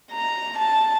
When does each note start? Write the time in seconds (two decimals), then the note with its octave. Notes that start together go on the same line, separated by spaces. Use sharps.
0.11 A#5
0.58 A5